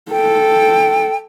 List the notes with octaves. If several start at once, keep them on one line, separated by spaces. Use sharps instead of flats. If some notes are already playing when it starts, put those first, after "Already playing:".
A4 G5